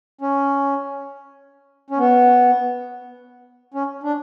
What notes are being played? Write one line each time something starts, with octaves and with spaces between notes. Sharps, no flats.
C#4
C#4
B3
C#4
D4